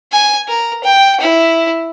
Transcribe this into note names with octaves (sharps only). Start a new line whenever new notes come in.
G#5
A#4
G5
E4